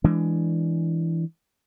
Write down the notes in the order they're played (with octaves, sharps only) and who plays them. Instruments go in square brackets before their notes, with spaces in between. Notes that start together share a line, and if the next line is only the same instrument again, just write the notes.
[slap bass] E3 G#3 D4